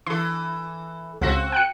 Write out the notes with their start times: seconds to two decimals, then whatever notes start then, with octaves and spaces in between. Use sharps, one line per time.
0.07 E3 A4 C6
1.21 C#2 C4 F#4 A4 F5 A#6
1.52 G5 F#6 C#7